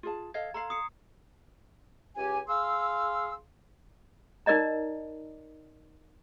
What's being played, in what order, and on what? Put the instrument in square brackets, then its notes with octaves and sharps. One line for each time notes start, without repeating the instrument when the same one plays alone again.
[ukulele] F4 G#4 A5
[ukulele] A4 D#5 F5 [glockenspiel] G#6
[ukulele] A4 F5 [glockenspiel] A#5 C6 C7
[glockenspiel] D#6 C7 C#7
[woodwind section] C#2 G4 G#5
G#4 F5 C6 E6
[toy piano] D#4 A#4 D5 D#5 A#5